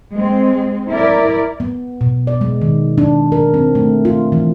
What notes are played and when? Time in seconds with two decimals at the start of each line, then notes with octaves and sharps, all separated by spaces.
0.14 G#3 C4
0.89 E4 A#4 D5
1.60 B3
2.01 B2
2.27 D5
2.41 G#3
2.62 D#3
2.98 D4
3.32 A#4
3.54 C4
3.75 A3
4.05 F4
4.32 E3